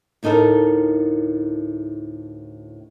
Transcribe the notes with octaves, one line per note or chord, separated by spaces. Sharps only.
D2 A2 D#4 A4 A#4